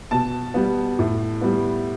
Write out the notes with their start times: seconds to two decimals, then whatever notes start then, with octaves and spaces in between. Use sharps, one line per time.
0.11 B2 A5
0.54 G3 B3
0.99 A2
1.41 G3 B3